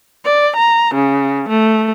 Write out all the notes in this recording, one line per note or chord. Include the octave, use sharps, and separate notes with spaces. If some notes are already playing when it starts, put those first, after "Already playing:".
D5
A#5
C#3
A3